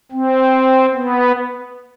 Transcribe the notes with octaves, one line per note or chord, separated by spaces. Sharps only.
C4
B3